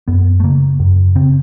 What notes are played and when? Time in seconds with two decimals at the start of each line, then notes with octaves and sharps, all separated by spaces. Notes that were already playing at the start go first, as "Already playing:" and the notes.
0.08 F#2 B3
0.40 A3
0.44 C#3 A#3
0.79 F#2
1.15 C#3 C4